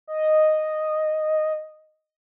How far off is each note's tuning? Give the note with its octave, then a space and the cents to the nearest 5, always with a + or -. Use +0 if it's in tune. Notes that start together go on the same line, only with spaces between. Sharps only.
D#5 -5